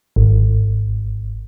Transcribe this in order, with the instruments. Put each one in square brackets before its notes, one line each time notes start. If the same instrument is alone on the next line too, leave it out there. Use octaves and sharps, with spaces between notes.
[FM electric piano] G#1